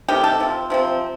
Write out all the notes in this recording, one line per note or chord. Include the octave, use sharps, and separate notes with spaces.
C3 D#3 A3 G4
A4
C3 F3 C4
C3 F3 C4